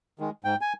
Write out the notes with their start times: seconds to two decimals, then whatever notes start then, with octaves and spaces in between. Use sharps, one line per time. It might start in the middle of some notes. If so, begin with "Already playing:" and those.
0.19 D#3 G#3
0.44 G#2 G5
0.61 G#5